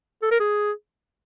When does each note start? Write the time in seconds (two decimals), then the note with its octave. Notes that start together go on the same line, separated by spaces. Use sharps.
0.23 A4
0.31 A#4
0.40 G#4